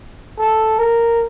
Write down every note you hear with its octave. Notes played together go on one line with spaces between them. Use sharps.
A4
A#4